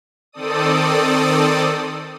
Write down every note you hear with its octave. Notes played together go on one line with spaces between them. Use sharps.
D#3 C4 A4 D5 D#6